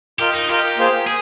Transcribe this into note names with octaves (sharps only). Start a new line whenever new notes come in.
F4 G4 A#4 D#5
D#4
F4 G4 A#4 D#5
A#3 F4 G#4 C5
G#4